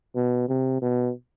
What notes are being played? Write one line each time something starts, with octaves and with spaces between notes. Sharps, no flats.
B2
C3
B2